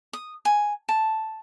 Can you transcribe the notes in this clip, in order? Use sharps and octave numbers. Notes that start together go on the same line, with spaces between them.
D#6
G#5
A5